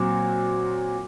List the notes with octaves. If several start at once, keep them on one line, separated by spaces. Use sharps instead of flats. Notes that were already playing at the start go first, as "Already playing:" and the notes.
Already playing: A#2 F#3 C4 F#4